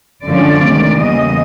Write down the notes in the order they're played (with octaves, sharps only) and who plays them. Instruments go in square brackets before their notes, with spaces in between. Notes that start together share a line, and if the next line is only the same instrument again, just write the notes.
[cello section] F#2 D3 F3 G#3 C#4 D5
D2 C3 D#3 G#3
E2 C#3 E3 G3 A#3 D#5